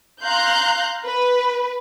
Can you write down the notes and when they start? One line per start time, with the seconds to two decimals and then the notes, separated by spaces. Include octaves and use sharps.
0.24 F5 A#5 C6 F#6 G6
1.04 B4